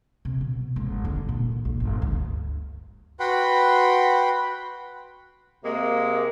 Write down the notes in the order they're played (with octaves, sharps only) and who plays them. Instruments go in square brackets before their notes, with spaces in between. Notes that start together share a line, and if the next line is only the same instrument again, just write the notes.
[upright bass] C3
B2
G#1
D3
A#2
E3
A#1
G1
D2
[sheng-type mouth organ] F#4 B4 F#5 G5 B5 C6
[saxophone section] C3 G#3 A#3